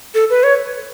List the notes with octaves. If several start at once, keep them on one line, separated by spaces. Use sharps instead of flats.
A4
B4
C#5